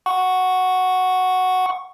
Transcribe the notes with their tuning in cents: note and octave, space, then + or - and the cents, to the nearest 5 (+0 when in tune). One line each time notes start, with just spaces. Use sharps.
F#5 +0 C#6 +0